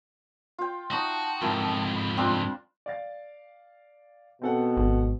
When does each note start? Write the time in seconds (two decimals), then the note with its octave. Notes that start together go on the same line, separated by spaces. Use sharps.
0.58 F4 G5
0.91 D#4 F#4 A5 C#6 D#6
1.42 F2 G#2 E4 F4 A#4
1.95 B5
2.17 C4 D4 F4
2.86 D5 F5 A6
4.42 B2 C4 A4 F#5
4.77 G#1